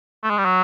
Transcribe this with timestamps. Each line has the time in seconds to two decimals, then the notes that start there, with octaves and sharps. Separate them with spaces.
0.23 A3
0.30 G#3
0.38 G3
0.45 F#3